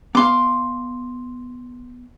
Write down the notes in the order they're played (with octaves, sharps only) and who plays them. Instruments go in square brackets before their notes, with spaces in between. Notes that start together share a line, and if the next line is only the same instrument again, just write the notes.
[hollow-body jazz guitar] B3 F5 [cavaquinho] C6 D6